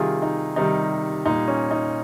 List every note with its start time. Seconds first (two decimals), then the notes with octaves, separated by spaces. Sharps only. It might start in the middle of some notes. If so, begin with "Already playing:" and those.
Already playing: C3 D#3 G3 F4 G#4
0.22 D#4
0.56 C3 D#3 G3 D#4
1.25 A#2 G3 D#4
1.48 C#4
1.71 D#4